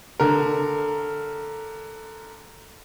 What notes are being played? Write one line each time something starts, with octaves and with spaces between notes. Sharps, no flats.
D3 A#4